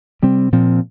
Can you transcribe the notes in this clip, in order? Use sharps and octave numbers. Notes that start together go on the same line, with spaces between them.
C3 G3 C4
A#2 F3 C4